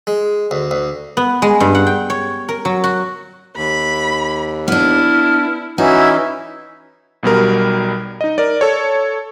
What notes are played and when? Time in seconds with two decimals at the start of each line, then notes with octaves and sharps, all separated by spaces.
0.07 G#3
0.51 D2
0.71 D2
1.17 B3
1.42 G#3
1.60 G2
1.75 F#5
1.87 G5
2.10 C#5
2.49 A#4
2.65 F#3
2.84 F#4
3.56 D#2 B5
4.68 B3 D4 E4 F6
5.78 E3 C#4 D#4 E4 F#4
7.23 B1 B2 G3 A#4
8.21 D#4 D#5
8.38 A#4 D5
8.61 A4 C#5